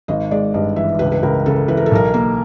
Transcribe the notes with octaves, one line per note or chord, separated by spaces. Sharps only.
G#1 D#5
G#3 D5
G2 D#5
E3 E5
C#2 B4
B4
C#2 A#4
C#3 A4
E3 B4
A#4
A4
B1 A#4
A#3